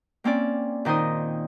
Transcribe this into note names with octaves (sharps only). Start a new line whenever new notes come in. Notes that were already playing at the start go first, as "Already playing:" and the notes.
A#3 C4 C#4 D5
A#2 D#3 D#4 C5 D#6